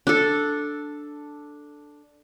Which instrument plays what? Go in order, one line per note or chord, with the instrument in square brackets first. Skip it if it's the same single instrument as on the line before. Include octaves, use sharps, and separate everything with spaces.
[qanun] D4 A4